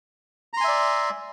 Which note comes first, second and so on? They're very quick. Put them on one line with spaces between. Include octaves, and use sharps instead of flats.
A#5 C6 G#5 E5 D5